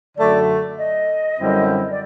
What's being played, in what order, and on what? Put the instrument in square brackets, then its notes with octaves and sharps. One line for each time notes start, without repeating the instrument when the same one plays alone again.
[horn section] F#2 D3 F#3 A3 [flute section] D5
[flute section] D#5
[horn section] F#2 D3 G3 C4 E4
[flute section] D5